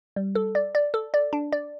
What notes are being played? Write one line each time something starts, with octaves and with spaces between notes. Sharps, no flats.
G3
A4
D5
D5
A4
D5
D4
D5